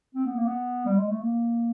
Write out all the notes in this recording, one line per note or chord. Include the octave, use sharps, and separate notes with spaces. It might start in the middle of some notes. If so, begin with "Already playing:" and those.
C4
B3
A#3
B3
G3
G#3
A3
A#3